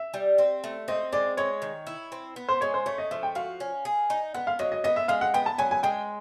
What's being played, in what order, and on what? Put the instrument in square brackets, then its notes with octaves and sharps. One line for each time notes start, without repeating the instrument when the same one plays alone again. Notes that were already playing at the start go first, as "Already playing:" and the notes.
Already playing: [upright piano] E5
[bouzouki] G3
C4
A3
[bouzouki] C4 [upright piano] D#5
[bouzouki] G#3 [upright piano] D5
[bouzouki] G#3 [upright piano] C#5
[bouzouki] D#3
E4
C4
B3
[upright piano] C5
[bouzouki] G#3 [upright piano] C#5
[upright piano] C5
[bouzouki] A3 [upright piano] C#5
[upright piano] D#5
[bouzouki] F3 [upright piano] E5
[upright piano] G5
[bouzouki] F#4 [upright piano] F5
[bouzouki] C#4
G#4
D#4
[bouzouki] B3 [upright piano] F#5
[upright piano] F5
[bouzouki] F#3 [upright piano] D#5
[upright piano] D#5
[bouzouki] B3 [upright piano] D#5
[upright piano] E5
[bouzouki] G#3 [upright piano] F5
[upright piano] F#5
[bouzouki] B3 [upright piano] G5
[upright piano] A5
[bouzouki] F#3 [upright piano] G#5
[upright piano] G#5
[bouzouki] G#3 [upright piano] G5